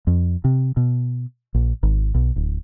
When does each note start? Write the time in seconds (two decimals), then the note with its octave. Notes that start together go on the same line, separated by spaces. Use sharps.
0.07 F2
0.44 C3
0.77 B2
1.54 A#1
1.83 G#1
2.15 B1
2.36 D1